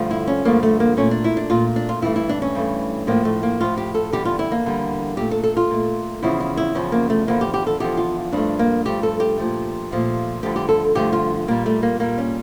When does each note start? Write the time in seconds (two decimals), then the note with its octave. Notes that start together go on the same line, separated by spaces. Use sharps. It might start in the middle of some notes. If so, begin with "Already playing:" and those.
Already playing: G2 D3 F3 A3
0.11 E4
0.27 C#4
0.45 G2 D3 F3 A3 A#3
0.63 A3
0.80 A#3
0.97 A#2 A3 C#4
1.11 D4
1.24 E4
1.37 D4
1.50 A#2 A3 F4
1.76 D4
1.89 F4
2.02 G2 E3 A3 E4
2.16 E4
2.29 D4
2.42 C#4
2.55 G2 E3 A3
3.07 A2 F3 A3 A#3
3.25 A3
3.43 A#3
3.60 A2 F3 A3 F4
3.77 G4
3.95 A4
4.13 E2 D3 G3 G4
4.25 F4
4.39 E4
4.52 A#3
4.65 E2 D3 G3
5.17 A#2 A3 G4
5.31 A4
5.44 A4
5.57 F4
5.71 A#2 A3
6.23 E2 C#3 F3 E4
6.40 E4
6.57 E4
6.75 E2 C#3 F3 C#4
6.92 A#3
7.10 A3
7.27 E2 D3 F3 A#3
7.41 G4
7.54 G4
7.67 A4
7.80 E2 D3 F3 G4
7.97 F4
8.32 G2 F3 A3 D4
8.59 A#3
8.85 G2 F3 A3 G4
9.03 A4
9.20 G4
9.37 A#2 F3 A3
9.91 A#2 F3 A3
10.43 G2 D3 F3 A3 G4
10.56 G4
10.69 A4
10.95 G2 D3 F3 A3 G4
11.13 F4
11.48 A#2 G3 A#3
11.66 A3
11.83 A#3
12.00 A#2 G3 A#3
12.18 C#4